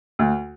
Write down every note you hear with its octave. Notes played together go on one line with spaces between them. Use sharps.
D2